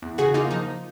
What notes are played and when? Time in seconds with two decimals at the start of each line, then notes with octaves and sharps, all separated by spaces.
0.02 E2
0.18 C#3 F#4 G#4
0.34 A#3 D#4 F4
0.51 F3 D#4